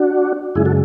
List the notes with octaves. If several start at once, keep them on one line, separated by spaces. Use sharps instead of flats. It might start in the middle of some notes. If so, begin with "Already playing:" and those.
Already playing: D4 F#4
F#2 C#3 G#3 E4 G#4
F#4 A4